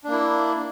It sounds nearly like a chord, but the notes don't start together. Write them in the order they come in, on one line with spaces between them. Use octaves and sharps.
D4 A#3 E4